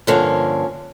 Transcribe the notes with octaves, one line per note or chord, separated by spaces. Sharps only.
G2 D3 F3 A#3 C#4